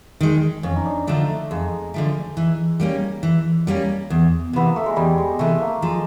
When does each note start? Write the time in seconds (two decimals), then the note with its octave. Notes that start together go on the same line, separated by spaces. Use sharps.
0.21 D#3 G#3
0.63 F2 C#4
0.76 D#4
0.86 D4
1.07 D3 F3 A3 D#4
1.28 A3
1.51 F2 G#3
1.94 D3 F3 A3
2.37 E3
2.80 G3 A#3 C#4
3.23 E3
3.67 G3 A#3 C#4
4.10 E2
4.53 C3 E3 B3
4.67 A#3
4.76 A3
4.86 G#3
4.96 E2 G3
5.18 G#3
5.39 C3 E3 A3
5.61 A#3
5.82 F3 G#3